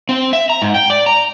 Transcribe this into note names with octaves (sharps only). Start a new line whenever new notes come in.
C4
E5
A#5
G#2
G5
D5
A#5